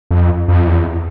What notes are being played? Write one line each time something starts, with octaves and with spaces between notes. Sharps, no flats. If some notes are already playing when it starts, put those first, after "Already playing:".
F2
F2
E2